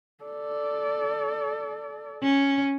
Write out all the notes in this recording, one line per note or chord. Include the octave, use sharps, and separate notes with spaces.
A4 D5
C#4